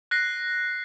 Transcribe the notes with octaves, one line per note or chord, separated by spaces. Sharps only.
F#6 A#6 C7